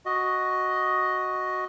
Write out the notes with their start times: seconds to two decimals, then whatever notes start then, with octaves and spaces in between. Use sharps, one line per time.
0.06 F#4 D#5